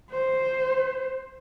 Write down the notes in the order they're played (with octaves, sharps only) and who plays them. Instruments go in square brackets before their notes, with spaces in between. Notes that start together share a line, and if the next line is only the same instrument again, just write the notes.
[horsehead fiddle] C5